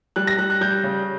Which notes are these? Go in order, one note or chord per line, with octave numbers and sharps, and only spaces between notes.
G3 F#6
A#6
G3 F#6
F#6
G3 G6
C#3